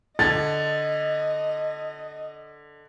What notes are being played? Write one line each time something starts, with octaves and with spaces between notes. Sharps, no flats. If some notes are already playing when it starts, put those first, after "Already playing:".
D3 D#5 A6